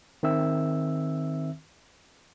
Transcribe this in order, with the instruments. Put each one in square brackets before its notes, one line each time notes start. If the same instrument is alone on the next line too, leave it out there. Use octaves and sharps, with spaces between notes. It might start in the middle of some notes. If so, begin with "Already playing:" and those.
[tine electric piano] D#3 C4 E5 E6